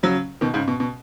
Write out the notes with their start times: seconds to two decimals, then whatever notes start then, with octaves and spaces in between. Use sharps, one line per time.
0.03 C#3 F#3
0.41 B2 D#3
0.54 G#2 C#3
0.68 B2
0.80 B2